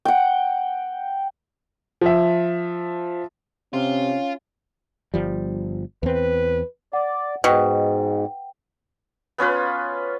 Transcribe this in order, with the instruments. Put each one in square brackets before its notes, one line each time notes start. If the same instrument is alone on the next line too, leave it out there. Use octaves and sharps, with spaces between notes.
[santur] F#5 G5
[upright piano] F3 E5
[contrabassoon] C3 [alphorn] C#4 [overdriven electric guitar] F4
[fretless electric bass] G1 F3 G3
[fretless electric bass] E2 C4 [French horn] B4
[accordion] D5 [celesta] F#5
[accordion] G#2 [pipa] B2 [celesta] F#5 G5
[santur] B3 C#4 F4 B4